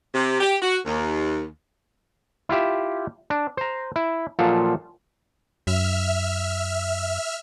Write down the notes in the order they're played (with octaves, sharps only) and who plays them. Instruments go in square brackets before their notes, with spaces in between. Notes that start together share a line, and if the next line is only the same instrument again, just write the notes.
[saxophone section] C3
G4
F#4
D#2
[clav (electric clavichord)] E4 F4 G4 E5
D4
C5 A#5
E4
A#2 F3 F#3 F4 A4
[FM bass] F#2 [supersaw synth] E5 F6